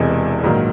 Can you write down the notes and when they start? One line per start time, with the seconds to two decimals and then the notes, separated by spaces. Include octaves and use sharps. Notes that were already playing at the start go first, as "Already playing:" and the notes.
Already playing: E1 E2 C3 E3 G#3
0.43 A#1 G#2 D#3 F#3 A#3